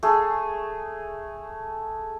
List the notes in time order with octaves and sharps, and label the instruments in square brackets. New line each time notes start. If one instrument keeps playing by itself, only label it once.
[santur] A3 G#4